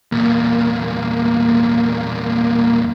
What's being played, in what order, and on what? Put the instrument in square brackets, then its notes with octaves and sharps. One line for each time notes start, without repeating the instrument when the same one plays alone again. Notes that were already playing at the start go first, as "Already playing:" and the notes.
[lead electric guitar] E2 A#2 [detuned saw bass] A#3